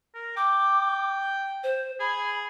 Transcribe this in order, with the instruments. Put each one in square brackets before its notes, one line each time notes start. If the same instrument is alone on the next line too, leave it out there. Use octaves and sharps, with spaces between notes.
[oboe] A#4
[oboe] G5 [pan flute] D6
[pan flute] C5
[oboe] G#4 [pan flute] B5